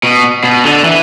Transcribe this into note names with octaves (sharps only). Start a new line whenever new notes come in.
B2
B2
D3
E3